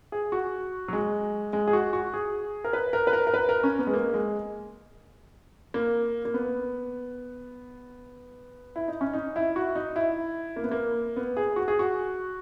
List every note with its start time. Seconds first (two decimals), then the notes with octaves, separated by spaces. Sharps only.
0.12 G#4
0.32 F#4
0.88 F#3
0.93 G#3
1.53 G#3
1.67 G#4
1.73 F#4
1.93 F#4
2.14 G#4
2.64 A#4
2.73 B4
2.93 A#4
3.07 B4
3.13 A#4
3.27 A#4
3.34 B4
3.49 A#4
3.64 C#4
3.79 B3
3.87 G#3
3.94 A#3
4.14 G#3
5.74 A#3
6.25 A#3
6.34 B3
8.76 E4
8.88 D#4
9.01 C#4
9.13 D#4
9.36 E4
9.56 F#4
9.75 D#4
9.96 E4
10.56 A#3
10.64 B3
10.71 A#3
11.16 B3
11.37 G#4
11.56 F#4
11.68 G#4
11.79 F#4